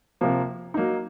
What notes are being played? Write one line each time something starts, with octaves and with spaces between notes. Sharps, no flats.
C3 F3 A#3
F#3 A#3 D#4